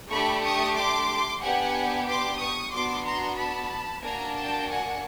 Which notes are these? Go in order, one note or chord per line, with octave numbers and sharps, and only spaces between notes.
A3 D4 G4 B5 C#6
C#6 D#6
C6 D6
B3 D4 G4 F#5 G#5
C6 D6
C#6 D#6
B3 D4 F#4 C6 D6
A#5 C6
A5 B5
A#3 D4 F#4 G#5 A#5
G5 A5
F#5 G#5